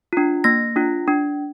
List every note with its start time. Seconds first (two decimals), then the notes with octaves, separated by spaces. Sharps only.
0.13 D4 F4
0.44 A#3 A#6
0.76 D4 F4
1.08 D4